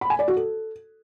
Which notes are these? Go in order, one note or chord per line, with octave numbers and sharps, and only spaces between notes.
B5
G#5
D5
F#4
A4